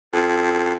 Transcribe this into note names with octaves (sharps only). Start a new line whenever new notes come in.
F2